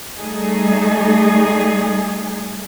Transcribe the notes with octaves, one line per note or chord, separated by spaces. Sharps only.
G3 A3 D#4 G#4